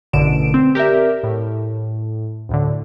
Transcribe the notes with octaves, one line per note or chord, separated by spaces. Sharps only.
A1 F#2 B2 D3 D7 E7
C4
G4 A#4 D5 E5
A2
D2 A2 D3